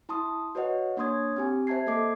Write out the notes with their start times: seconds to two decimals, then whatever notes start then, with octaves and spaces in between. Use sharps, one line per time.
0.09 E4 A5 C6 D#6
0.55 F#4 B4 C#5 D#5 F#5
0.97 A#3 D4 C#5 C6 D#6 G#6
1.36 C4 G4 G#5
1.67 C5 E5 A5 G#6 C7
1.86 A#3 A4 D#5 D6 C7